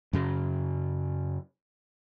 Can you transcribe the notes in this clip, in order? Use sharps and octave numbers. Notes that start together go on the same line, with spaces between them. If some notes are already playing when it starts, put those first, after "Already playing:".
F#2 C#3 F#3